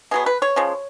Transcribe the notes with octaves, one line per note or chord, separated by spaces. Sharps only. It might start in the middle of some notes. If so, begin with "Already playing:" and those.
B2 F#3 B3 G#4
B4
C#5
C#3 F3 G#3